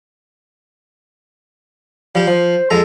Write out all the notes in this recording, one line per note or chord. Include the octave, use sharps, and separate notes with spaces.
F3 G3 G4
F3 C5
F2 G#3 A4 A#5